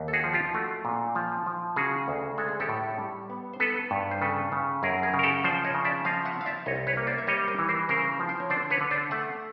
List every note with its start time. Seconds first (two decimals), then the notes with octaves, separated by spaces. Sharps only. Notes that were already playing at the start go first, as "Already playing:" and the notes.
Already playing: D#2
0.08 A4
0.13 F#4 G#4
0.24 F3
0.33 F4 G4
0.54 A3 F#4
0.85 A#2
1.15 F3
1.46 F3
1.76 C#3 F#4 G#4
2.08 D2
2.38 G#3 A4
2.48 G#4
2.60 G4 A4
2.69 A2
2.99 G3
3.30 B3
3.53 C5
3.60 B3 A4 B4
3.91 G2
4.11 C5
4.22 C#3 A4 B4
4.52 C#3
4.83 F#2 G#4 A#4
5.03 G#4 A#4
5.14 C#3
5.19 A#4
5.23 G4 A4
5.44 F3 C5 D5
5.64 C#5 D#5
5.75 C#3
5.85 D5 E5
6.05 F3 D#5 F5
6.25 E5 F#5
6.36 C4
6.41 F5
6.46 D5 E5
6.66 C2 C#5 D#5
6.87 B4 C#5
6.97 A#3
7.07 C5 D5
7.18 E5
7.27 G3 C#5 D#5
7.48 A#4 C5
7.59 E3
7.69 A#4 C5
7.89 C#3 A#4 C5
8.20 F3
8.29 C5
8.40 C#5
8.50 D3 C5 D5
8.70 B4 C#5
8.81 D3
8.91 C5 D5
9.11 A3 E5 F#5